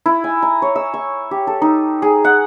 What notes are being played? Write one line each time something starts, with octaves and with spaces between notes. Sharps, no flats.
E4
G#5
A#5
C#5
E6
C#6
G4
A4
D#4
G#4
F#5